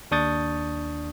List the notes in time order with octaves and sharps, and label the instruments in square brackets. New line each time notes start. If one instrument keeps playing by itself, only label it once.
[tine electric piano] D#2 D4 C#6 D#6 G6 A6